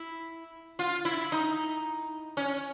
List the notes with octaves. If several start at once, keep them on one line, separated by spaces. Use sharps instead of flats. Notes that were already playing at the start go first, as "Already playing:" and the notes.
Already playing: E4
F4
E4
D#4
C#4